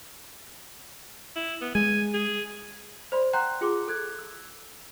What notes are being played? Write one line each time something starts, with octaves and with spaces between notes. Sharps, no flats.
E4
B3
G#3 G#5
G#4
C5 D5 B5 C6
F#5 G5 A#5 C6 F#6 G6
F4 G#4 C6 D6
A4 F#6 G#6
E6